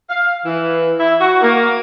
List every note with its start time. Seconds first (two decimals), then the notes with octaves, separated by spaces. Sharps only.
0.10 F5
0.45 E3
1.00 E4
1.20 F#4
1.42 A#3